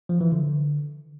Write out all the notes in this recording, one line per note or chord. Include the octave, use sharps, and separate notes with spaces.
F3
E3
D3